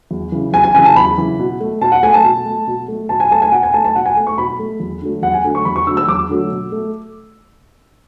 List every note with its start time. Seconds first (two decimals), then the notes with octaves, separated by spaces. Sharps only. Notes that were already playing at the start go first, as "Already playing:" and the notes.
0.11 E2
0.32 C#3 E3
0.53 E2 G#5
0.64 G#5
0.74 C#3 G#5
0.78 E3
0.85 A5
0.95 E2 B5
1.18 C#3 E3
1.39 B2
1.60 A3
1.81 B2 A5
1.92 F#5
2.03 A3 G#5
2.14 A5
2.24 B2
2.45 A3
2.67 B2
2.88 A3
3.09 B2 A5
3.20 G#5
3.31 A3 A5
3.42 G#5
3.52 B2 F#5
3.63 G#5
3.73 A3 A5
3.85 A5
3.95 B2 F#5
4.06 G#5
4.16 A3
4.27 C#6
4.38 B2 B5
4.59 A3
4.80 E2
5.02 D3 F#3 A3
5.22 E2 F#5
5.34 G#5
5.44 D3 F#3 A3
5.55 C#6
5.65 E2 B5
5.76 C#6
5.87 D3 F#3 A3 E6
5.97 E6
6.08 E2 D6
6.29 D3 F#3 A3
6.51 B2
6.72 A3